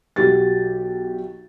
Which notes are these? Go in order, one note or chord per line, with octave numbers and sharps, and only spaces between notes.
B1 F#4 G4 A6